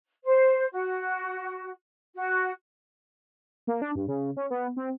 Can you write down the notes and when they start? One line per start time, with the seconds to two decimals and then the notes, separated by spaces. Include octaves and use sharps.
0.24 C5
0.72 F#4
2.15 F#4
3.67 A#3
3.82 D4
3.95 G2
4.08 C#3
4.37 C#4
4.50 B3
4.77 C4